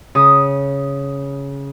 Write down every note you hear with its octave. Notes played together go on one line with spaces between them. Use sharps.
C#3 D#6